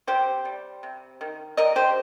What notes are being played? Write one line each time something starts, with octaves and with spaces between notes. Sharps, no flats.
C3 G4 C5
G3
C3
D#3
G3 A#4 D#5
G4 C5